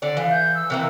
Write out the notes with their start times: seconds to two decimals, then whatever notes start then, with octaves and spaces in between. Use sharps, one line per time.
0.02 D3 D5
0.17 E3 F5
0.31 G6
0.55 E6
0.70 C3 E3 A#3